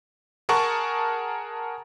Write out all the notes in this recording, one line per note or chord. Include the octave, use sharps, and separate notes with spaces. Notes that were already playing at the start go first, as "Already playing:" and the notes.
G#4 A#4 F#5 A5 C#6